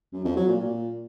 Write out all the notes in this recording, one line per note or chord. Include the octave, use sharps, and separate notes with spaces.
F#2
F2
F#3
A#2
A#2